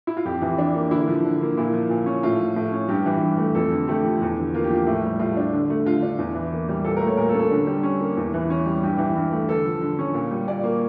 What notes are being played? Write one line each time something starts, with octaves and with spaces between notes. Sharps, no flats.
E4
F4
F2 G4
E3
D4
A#3
D3 E4
F3
D3
A#3
A#2 E4
F3
A#2
C#4
A2 F4
F3
A2
C#4
G2 G4
E3
G2
A3
F2 A4
D3
A3 G4
F3
E2
D3
A#3 F4
G4
F3 F4
A2
G3
A2 F4
D4
D3
A3
D3 F4
D4
E2
E3
A#3
G3
A#2 A4
A#4
A3
C#5
A#2 A#4
A4
C#4
A4
D3
G3
C#4
A#3
E2
E3
C#4
G3
G2 G4
E3
G2
A3
D3 A4
F3
D3
C#4
A#2
G3
A#2 D5
A#3